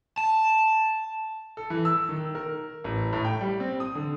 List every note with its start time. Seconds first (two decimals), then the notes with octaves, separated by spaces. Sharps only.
0.18 A5
1.57 A4
1.70 E3
1.85 E6
2.09 D#3
2.35 A#4
2.84 A1
3.13 A2
3.25 G5
3.41 G3
3.60 C4
3.80 D#6
3.95 D3